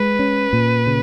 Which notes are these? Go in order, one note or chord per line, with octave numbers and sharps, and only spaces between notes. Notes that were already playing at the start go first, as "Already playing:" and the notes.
Already playing: G#3 B4
C#4
A#2
C#3